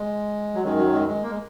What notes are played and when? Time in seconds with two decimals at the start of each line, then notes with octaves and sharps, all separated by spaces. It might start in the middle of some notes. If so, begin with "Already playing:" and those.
Already playing: G#3
0.54 F#3
0.63 F#2 D#3 G#3
0.78 F#3
0.93 G#3
1.07 G#3
1.23 A#3
1.30 G#3